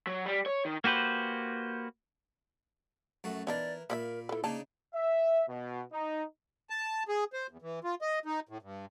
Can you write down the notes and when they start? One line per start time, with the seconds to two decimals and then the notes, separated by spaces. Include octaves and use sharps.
0.07 F#3
0.26 G3
0.46 C#5
0.65 D#3
0.84 A#3 F#4 G4 B4 C5
3.24 F#2 A3 F#4
3.47 E3 B3 D4 D#4 A#4 D5
3.90 A#2 A#3 A#4 D5 E5 B5
4.29 E4 A4 B4
4.44 C#3 A#3 D4 D#4 A5
4.94 E5
5.49 B2
5.92 D#4
6.70 A5
7.08 G#4
7.33 C5
7.50 E2
7.62 E3
7.84 F4
8.02 D#5
8.26 D#4
8.49 A2
8.62 G2